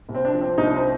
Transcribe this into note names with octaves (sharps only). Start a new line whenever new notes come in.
C2
C4
D4
F3
C4
C2 D#4
D4
C4
F3